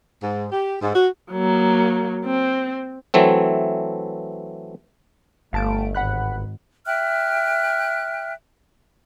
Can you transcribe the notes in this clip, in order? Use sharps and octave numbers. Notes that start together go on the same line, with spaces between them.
G#2
G4
G#2
F#4
F#3 A#3
C4
E3 F#3 A3 C4
G1 A3 F5 A5 D7
G#1 F#5 B5 F#6
E5 G5 F6 F#6